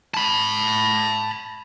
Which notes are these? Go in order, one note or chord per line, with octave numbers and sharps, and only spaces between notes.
A5 B5